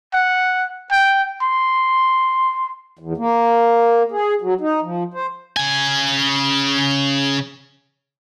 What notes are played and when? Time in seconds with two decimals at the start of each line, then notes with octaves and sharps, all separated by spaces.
0.14 F#5
0.91 G5
1.42 C6
2.99 E2
3.17 A#3
4.12 G#4
4.42 F#3
4.61 D#4
4.82 F3
5.14 C5
5.57 C#3 G#5